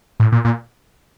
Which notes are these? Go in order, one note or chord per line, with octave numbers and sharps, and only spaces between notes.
A2
A#2
A#2